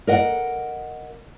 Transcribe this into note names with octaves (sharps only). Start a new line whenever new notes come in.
A#4 D#5 F#5